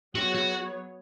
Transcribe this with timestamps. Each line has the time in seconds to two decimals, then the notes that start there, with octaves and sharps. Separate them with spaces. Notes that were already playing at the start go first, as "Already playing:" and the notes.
0.15 F#3 B3 F#4 G#4 C#5
0.35 F#4